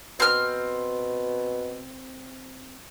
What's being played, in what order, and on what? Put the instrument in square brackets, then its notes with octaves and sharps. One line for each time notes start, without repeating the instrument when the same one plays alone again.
[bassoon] B2 [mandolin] C4 F6